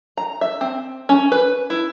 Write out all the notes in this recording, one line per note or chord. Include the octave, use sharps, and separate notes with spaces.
A#5
E5
C4
C#4
B4
E4